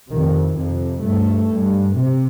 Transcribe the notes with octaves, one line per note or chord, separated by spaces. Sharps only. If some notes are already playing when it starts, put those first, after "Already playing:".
F2 C3 D#3
F2 C3
G2 A3
G2
C3